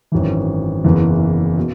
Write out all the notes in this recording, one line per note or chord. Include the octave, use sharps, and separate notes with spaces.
G#1 F#2 E3
F#1 E2 E3
B2